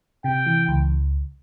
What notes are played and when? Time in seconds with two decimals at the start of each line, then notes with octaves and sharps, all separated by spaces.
0.24 C3 G5
0.46 E3
0.68 C#2